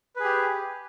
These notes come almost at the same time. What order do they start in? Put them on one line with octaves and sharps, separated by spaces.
B4 G#4 G4